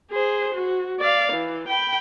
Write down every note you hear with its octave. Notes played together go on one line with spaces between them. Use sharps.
G#4 C5
F#4
D5 F5
E3
G5 B5